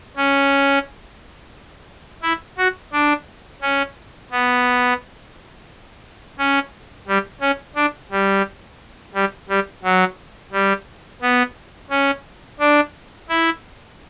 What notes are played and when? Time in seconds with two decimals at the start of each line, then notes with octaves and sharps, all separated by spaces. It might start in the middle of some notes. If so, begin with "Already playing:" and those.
0.16 C#4
2.23 E4
2.58 F#4
2.93 D4
3.61 C#4
4.31 B3
6.38 C#4
7.07 G3
7.41 C#4
7.76 D4
8.11 G3
9.14 G3
9.49 G3
9.83 F#3
10.52 G3
11.22 B3
11.90 C#4
12.60 D4
13.29 E4